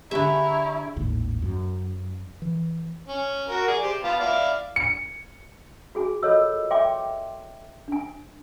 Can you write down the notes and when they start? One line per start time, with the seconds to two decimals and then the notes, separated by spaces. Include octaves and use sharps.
0.11 D3 D4 E4 G4 G#4 E5 A#5 C#6
0.96 G#1 D#2 A2
1.42 F#2
2.42 E3
3.08 C#4
3.49 F#4 A#4
3.68 G#4 D5
3.83 G4 C5
4.04 B3 F4 A5
4.20 E4 D5 F5
4.76 C#7
5.95 F#4 G#4 G#5
6.23 F4 A4 A#4 C#5 D#5 E6
6.70 C#5 E5 G5 G#5 C6 D6
7.88 D4 G#5